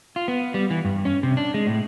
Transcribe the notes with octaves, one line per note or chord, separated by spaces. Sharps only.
F4
B3
G3
E3
G2
C#4
C3
D4
G#3
A2